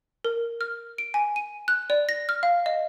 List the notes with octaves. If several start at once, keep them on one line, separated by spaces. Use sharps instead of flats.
A#4
F6
D7
G#5
D#7
F#6
D5
A#6
F6
F5
D#5